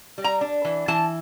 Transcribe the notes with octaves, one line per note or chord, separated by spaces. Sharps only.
G3
A#5
D4
E3
E3 A5